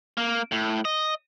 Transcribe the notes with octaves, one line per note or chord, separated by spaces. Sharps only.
A#3
A2
D#5